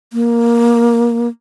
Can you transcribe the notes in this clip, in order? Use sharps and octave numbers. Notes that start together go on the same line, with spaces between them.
A#3